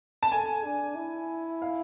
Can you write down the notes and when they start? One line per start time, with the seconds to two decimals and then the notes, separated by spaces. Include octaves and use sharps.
0.23 A5
0.32 A4 G#5
0.64 D4
0.96 E4
1.62 F5